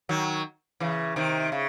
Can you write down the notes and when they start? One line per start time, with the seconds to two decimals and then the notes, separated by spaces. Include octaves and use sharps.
0.09 D#3 F#3
0.80 C#3 E3
1.16 C3 D#3
1.52 C#3